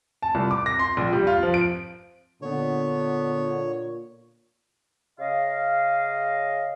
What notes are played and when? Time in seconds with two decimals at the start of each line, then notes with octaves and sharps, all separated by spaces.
0.22 A5
0.35 C2
0.51 D6
0.66 A#6
0.79 C6
0.97 A#1
1.13 G3
1.27 F4
1.43 F3
1.54 D7
2.42 A#2 D3 B3 C#5
5.20 C#3 D#5 F5